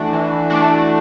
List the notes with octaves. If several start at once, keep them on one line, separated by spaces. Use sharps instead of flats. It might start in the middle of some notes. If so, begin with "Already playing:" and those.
Already playing: E3 A3 D4 F#4
E3
A3 D4 F#4